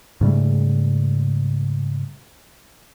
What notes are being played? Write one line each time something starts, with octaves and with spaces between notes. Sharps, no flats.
G#2 C#3 G3 A3